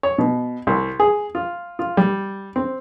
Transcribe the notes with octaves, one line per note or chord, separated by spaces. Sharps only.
C#5
B2
C2
G#4
F4
F4
G3
C4